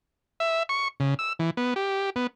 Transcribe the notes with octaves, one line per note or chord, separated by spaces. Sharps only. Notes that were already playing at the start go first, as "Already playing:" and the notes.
E5
C#6
C#3
E6
E3
B3
G4
B3